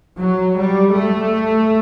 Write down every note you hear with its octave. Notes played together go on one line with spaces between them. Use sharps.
F#3
G3
A3